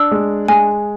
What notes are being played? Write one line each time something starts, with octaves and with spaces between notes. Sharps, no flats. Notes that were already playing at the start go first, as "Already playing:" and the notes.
Already playing: D4 E6
G#3
G#3 G#5